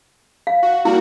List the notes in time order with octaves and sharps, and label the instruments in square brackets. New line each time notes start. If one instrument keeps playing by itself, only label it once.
[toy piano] F5
[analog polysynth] F#4
[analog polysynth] G3 A#3 F#4 [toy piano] E4